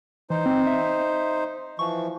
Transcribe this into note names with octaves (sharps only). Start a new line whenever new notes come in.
E3 D#4 C5
C4
E5
E3 F3 C#6